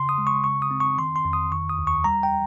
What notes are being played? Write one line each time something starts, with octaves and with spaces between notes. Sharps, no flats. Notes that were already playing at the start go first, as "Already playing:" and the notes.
Already playing: C#3 C6
D#6
G#3
C#6
C#3 C#6
D#6
C4
C#6
D#3 C6
C6
F2
D#6
D#3 C#6
D#6
D#2
C#6
G3 A#5
G5